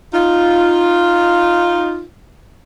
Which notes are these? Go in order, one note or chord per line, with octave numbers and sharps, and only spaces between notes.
D#4 F4